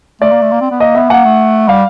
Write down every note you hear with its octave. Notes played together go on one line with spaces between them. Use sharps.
A3 D5
A#3
A3
A#3
C4
B3
A#3 D#5
B3 E5
A#3 F#5
A3
G3 F5